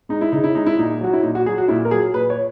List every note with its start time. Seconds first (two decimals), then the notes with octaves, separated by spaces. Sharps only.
0.09 G#3 D#4
0.21 E4
0.32 C#3 D#4
0.44 E4
0.55 G#3 D#4
0.66 E4
0.77 A#2 D#4
1.01 F#3 F#4
1.13 E4
1.23 A#2 D#4
1.35 F#4
1.46 F#3 G#4
1.58 F#4
1.68 A#2 E4
1.85 A#4
1.91 F#3 G#4
2.14 A#2 B4
2.30 C#5